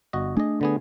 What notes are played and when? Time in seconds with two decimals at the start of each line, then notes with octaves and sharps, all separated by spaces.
0.13 G1 F#4 D#5
0.37 A3 D4 G#4 D#5
0.61 D3 B3 G#4